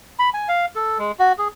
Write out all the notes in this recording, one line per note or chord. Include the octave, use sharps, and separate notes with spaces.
B5
G#5
F5
A4
G#3
F#4
G#4